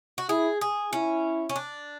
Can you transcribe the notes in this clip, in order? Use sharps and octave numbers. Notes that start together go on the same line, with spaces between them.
F#4
E4 G#4
G#4
C#4 E4
C#4
D4